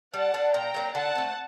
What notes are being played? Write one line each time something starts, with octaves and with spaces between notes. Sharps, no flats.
G3 F#5 A5
D4 A4
A#2 G5 A#5
F#3 A#3 D4
D3 F#5 A5
A3 C4